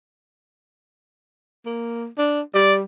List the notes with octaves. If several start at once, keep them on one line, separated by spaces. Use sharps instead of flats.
A#3
D4
G3 D5